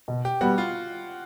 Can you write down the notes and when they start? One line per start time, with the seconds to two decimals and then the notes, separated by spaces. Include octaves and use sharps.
0.08 B2
0.25 G4
0.41 G3 B3 F#4
0.58 F4